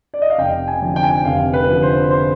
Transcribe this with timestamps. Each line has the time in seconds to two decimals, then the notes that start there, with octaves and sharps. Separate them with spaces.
0.14 D5
0.22 D#5
0.30 F5
0.38 F1 G5
0.68 G#5
0.82 F2 D3 F3
0.96 G5
1.03 G#5
1.11 G5
1.25 F1 F5
1.53 B4
1.68 F2 D3 F3
1.83 C5
2.10 C5